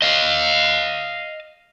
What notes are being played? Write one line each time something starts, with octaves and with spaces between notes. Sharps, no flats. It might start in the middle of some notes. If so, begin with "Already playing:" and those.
D#5 F5